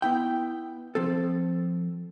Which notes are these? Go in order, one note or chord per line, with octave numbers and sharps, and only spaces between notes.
B3 E4 G5
F3 C4 A4